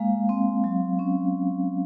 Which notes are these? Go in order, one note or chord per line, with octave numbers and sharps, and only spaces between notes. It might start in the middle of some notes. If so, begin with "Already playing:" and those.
Already playing: G#3 A#3 F5
C4
F#3
C#4